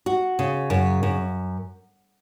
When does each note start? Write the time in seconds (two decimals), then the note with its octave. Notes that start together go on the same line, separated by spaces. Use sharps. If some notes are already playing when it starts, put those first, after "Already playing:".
0.06 F#4
0.39 C#3
0.70 F#2
1.03 F#2